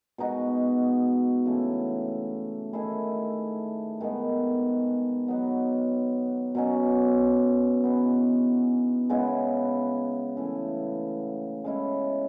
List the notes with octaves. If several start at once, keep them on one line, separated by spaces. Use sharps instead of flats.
B2 G#3 D#4 F#4
C#3 E3 A3 E4
D#3 A3 E4 G#4
D#3 G#3 B3
F#3 B3 D#4 F#4
B2 F#3 C#4
E3 B3 D#4 G#4
C#3 G#3 B3 E4
C#3 E3 A3
G#3 C#4 E4